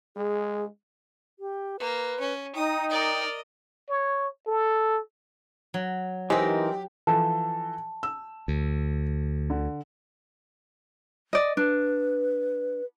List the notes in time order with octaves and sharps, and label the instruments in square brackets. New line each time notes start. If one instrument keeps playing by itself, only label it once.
[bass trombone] G#3 [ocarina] G#4
[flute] G4
[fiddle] A#3 [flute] B4
[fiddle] C#4
[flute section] D#4 [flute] G5 [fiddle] D#6
[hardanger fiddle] A#4 D5 [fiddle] D#5
[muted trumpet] C#5
A4
[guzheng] F#3
[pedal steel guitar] E3 D#4 A#4 [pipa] G#3 C4 [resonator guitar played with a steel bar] G4
[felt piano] E3 F3 A4 [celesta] A5
[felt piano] E6
[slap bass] D2
[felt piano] D3
[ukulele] D5 D#5
[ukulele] D4 [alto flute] B4